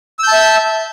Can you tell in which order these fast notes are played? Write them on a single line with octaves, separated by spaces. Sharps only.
E6 G6 A5 E5